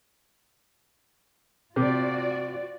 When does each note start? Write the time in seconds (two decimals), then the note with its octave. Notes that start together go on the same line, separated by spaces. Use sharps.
1.76 C3 F4 F#4 D5